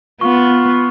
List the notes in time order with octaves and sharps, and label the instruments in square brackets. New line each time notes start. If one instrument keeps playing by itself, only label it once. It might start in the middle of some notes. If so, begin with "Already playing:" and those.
[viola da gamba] B3 [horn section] F4 [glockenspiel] C#6